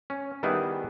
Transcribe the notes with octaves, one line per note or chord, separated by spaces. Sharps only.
C#4
D#3 G3 B3 E4 G#4 B4